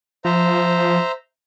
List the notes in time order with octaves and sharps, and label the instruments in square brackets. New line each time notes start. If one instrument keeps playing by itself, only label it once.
[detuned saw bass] F3 [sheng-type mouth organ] C5 E5 A#5